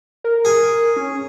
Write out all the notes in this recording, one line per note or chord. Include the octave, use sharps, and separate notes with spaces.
A#4
G#4
C#4